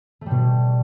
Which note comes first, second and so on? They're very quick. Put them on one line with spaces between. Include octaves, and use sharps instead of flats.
A3 G3 B2